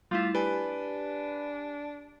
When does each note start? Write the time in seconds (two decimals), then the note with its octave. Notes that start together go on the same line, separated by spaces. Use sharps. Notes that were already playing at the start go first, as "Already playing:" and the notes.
0.11 G3 A3 E4 F4
0.35 D4 G4 B4 G#5